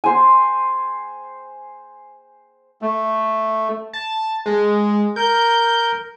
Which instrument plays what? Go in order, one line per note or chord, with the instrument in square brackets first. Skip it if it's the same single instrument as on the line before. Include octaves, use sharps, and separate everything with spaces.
[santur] C5 G#5
[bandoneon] A3
[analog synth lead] A5
G#3
[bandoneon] A#4 [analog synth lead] G6